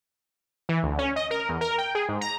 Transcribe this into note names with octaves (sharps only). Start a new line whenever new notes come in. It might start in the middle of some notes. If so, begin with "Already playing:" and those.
E3
D2
C#4
D#5
A#4
E2
A#4
G5
G#4
G#2
A#5